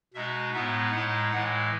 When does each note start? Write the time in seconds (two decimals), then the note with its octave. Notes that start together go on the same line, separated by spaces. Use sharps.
0.14 B2 G#3 D#4 E5
0.54 A2 G#3 B3 D#4 E5
0.92 A2 G#3 D#4 F#5
1.31 A2 E3 G#3 F#5